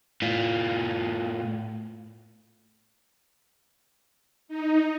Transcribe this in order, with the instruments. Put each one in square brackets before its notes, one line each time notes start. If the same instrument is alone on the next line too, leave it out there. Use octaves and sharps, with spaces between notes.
[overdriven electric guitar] A2 F4
[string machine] D#4